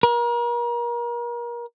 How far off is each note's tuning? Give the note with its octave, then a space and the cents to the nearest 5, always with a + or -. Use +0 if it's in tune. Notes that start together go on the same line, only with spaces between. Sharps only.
A#4 +35